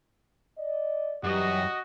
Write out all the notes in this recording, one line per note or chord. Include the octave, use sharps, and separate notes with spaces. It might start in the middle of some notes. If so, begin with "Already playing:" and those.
D5 D#5
F#2 E3 G3 F#4 G4 D#5